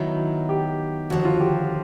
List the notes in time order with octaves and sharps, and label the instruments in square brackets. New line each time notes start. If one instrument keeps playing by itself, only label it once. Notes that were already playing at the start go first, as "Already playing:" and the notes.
Already playing: [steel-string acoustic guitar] D#3 F#3 B3 D#4 [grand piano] E4
[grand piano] G4
[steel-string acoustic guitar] D#2 D3 F3 [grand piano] F#4
[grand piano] F4
G4